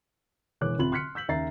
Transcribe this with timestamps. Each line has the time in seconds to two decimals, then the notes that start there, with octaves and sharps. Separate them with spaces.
0.61 E1 E2 A#3 C#5 D6 F#6
0.78 D1 C3 F4 B5 F#7
0.92 C6 F6 F#6 B6 C#7
1.15 E6 G6 B6 F#7
1.29 D#2 C#3 E5 A#5 A6 C7